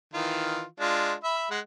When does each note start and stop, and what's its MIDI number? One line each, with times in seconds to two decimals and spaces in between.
0.14 0.64 51
0.14 0.64 52
0.14 0.64 65
0.80 1.13 56
0.80 1.13 62
0.80 1.13 65
1.24 1.49 76
1.24 1.49 83
1.51 1.60 56
1.51 1.60 78